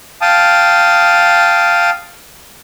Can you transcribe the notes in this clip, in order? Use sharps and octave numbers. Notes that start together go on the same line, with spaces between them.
F5 G5 A5 D#6